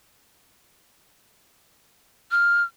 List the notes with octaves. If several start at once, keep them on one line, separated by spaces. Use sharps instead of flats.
F6